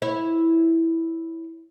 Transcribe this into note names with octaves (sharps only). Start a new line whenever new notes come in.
E4 C#5 E5